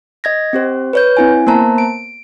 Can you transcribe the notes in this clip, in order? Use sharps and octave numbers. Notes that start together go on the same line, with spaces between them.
D#5 G#6 A#6
C4 G4 C5
B4 C#5 G6
C4 E4 G#5
A#3 B3 C5 A5 A#5
D7